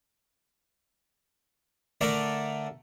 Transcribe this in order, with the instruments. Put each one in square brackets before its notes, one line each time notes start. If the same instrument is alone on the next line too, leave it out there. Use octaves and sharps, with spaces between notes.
[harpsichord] D3 A3 A#4 D5 A#5